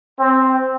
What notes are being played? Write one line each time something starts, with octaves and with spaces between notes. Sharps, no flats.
C4